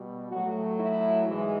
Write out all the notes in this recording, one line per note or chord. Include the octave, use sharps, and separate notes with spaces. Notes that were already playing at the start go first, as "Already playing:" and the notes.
Already playing: B2 G3
A2 F#3 A3 F#4
E4
G#2 E3 G#3